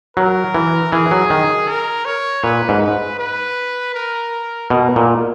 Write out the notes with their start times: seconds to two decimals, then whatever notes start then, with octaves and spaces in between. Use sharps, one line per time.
0.17 F#3 A#4
0.55 E3
0.92 E3 G#4
1.11 F#3
1.30 D#3
1.68 A#4
2.05 C#5
2.44 A#2 B4
2.69 G#2
2.81 B4
3.19 B4
3.95 A#4
4.70 B2 A#4
4.96 A#2